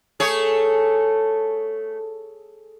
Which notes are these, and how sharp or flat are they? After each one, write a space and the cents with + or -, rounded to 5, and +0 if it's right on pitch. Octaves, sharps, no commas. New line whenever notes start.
A3 +0 G#4 +0 C#5 +0